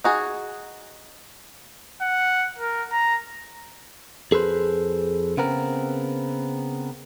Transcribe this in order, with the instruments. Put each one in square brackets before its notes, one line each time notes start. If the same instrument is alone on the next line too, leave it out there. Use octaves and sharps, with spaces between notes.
[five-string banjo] D#4 F#4 G#4
[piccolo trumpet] F#5
A#4
A#5
[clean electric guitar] F2 G#4 A4 B4 C5
C#3 B3 C4 A#4